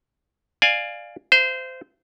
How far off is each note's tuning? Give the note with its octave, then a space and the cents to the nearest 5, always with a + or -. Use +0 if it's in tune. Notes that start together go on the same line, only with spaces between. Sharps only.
D5 +20 F5 +0 G#5 +0
C5 -20 F5 -45